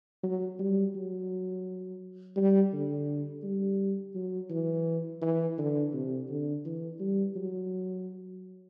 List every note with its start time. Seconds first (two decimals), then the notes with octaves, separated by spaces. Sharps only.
0.24 F#3
0.59 G3
0.95 F#3
2.37 G3
2.73 D3
3.43 G3
4.15 F#3
4.51 E3
5.22 E3
5.58 D3
5.93 C3
6.29 D3
6.65 E3
7.00 G3
7.36 F#3